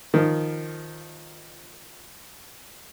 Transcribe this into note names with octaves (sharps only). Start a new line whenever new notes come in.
D#3 F3